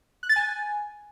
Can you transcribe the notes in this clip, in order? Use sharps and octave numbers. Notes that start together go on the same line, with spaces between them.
F#6
A6
G#5